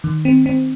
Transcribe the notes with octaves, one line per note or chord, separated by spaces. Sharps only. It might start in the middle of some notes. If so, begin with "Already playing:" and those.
D#3
C4
C4